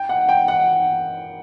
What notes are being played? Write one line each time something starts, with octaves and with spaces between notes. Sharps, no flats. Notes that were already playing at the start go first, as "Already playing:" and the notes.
Already playing: G5
F#5
G5
F#5